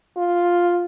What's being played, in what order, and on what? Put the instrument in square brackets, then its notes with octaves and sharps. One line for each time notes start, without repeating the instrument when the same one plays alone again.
[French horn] F4